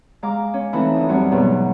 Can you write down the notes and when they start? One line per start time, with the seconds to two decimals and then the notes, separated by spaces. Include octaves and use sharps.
0.22 G#3 F5 A#5 D6
0.54 C#4
0.73 E3 A3 C4 D#4 E4
0.94 D2 D#6
1.09 F#2 F#3 G3 C4 F#4
1.31 E2 G#2 B2 F#3